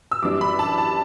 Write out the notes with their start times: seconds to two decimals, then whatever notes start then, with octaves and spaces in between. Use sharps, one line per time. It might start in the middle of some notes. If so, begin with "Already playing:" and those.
0.11 E6
0.22 F#2 E3 G3 D4 D6
0.41 B5
0.59 A5
0.78 A5